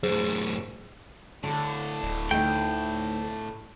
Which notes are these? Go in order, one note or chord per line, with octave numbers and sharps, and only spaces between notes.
F#2 A2 G#4
A2 D3 D4 A4
D1
D2 A3 D#4 G5